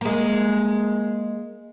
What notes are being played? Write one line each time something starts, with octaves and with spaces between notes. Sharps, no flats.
G#3 A#3